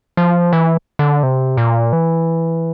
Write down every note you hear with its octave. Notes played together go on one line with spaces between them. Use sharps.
F3
E3
D3
C3
A#2
E3